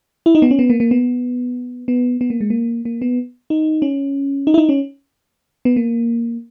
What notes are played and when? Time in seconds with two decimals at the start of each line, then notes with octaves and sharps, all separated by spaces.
0.26 E4
0.35 D#4
0.42 B3
0.51 C#4
0.59 B3
0.70 A#3
0.80 A#3
0.91 B3
1.88 B3
2.21 B3
2.30 A#3
2.41 G#3
2.50 A#3
2.85 A#3
3.02 B3
3.50 D#4
3.82 C#4
4.47 D#4
4.54 E4
4.58 D#4
4.69 C#4
5.65 B3
5.76 A#3